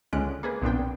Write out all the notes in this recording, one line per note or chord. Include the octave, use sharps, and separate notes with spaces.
C#2 D3 G#3 C#4 F#6 D7
A#3 G#4 B4
B1 A#2 B3 C4 D4 G5